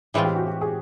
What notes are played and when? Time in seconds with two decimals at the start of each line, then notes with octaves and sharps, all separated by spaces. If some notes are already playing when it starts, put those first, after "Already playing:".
0.14 A2 E3 G#3 C4 F4 G#4
0.25 G4
0.36 F#4
0.47 G4
0.61 G#4